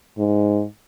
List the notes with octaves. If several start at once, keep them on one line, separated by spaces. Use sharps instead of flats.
G#2